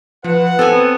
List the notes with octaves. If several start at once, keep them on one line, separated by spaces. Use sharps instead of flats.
F3 B4 F#5
B3 C4 A4 G#5